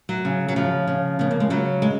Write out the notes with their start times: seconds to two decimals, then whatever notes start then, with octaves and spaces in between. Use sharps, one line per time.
0.09 F#3
0.25 C#3
0.48 F#3
0.56 C#3 F3
0.87 C#3
1.19 C#3 B3
1.31 A#3
1.40 G#3
1.50 C#3 F#3
1.82 G#3